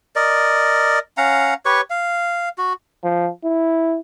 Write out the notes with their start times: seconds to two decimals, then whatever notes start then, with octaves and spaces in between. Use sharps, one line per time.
0.16 A#4 D5 D#5
1.17 C#4 F5 F#5 A#5
1.65 G4 B4 C#5 C#6
1.90 F5
2.58 F#4
3.04 F3
3.45 E4